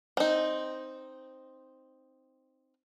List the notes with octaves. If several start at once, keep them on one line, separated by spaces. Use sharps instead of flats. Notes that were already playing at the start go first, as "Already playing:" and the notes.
C4 D#4